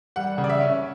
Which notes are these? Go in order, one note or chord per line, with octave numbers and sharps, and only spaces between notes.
G3 F#5
C#3
D5
E5
C#4